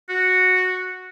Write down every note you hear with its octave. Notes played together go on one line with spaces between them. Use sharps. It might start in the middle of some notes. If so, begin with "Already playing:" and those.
F#4